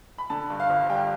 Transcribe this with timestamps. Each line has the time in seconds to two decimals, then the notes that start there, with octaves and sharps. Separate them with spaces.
0.18 B5
0.30 D3 A5
0.50 G2
0.60 F5
0.70 G1
0.90 G3 G5